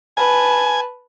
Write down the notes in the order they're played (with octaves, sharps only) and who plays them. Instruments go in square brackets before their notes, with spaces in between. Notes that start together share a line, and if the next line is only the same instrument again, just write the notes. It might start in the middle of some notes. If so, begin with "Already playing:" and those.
[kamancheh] B4 A5 [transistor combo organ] G#5